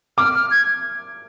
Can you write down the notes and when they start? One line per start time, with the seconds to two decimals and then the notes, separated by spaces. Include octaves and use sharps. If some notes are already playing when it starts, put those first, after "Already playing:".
0.18 D6 F6
0.34 F6
0.51 G#6